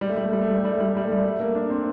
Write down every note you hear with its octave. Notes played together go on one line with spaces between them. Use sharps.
G3
A3
G3
A3
G3
A3
G3
A3
G3
A3
G3
A3
G3
A3
G3
A3
A#3
D4
C4